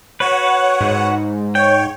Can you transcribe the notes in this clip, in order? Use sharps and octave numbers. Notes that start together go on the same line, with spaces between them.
F#4 B4 C#5 F#5
G#2
C#5 G5